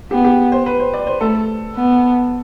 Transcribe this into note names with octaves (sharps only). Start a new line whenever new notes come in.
B3 G4
G4
C5
B4
C5
D5
C5
A3 A4
B3